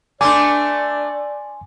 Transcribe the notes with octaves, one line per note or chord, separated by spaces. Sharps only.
A3 D4 D5 G#5 C6 D6 G6